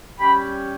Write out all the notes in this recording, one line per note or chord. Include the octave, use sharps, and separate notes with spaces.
G3 C#4 G4 G5 B5